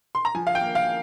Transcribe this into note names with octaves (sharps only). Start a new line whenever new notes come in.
C6
A#5
F3 G#5
F5
G5
A#3
F5